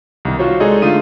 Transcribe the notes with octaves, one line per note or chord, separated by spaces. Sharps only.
C2 D#3
F4 F#4 C5 C#5
G#3 D#4 G#4 A4 D5 D#5
D3 A3 F4 D#6 D#7